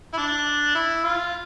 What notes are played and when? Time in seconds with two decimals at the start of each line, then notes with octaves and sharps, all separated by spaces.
0.14 E4
0.18 D4
0.75 E4
1.04 F4